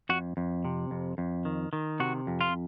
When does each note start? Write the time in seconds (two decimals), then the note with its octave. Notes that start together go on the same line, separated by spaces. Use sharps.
0.09 F2 F#4
0.37 F2
0.65 C3
0.91 F2
1.18 F2
1.45 D#3
1.73 D#3
2.00 C3 F#4
2.27 F2
2.41 F4